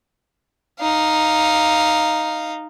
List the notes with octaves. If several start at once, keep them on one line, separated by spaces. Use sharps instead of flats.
D#4 F5